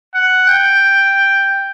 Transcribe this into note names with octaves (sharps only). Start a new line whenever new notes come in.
F#5
G5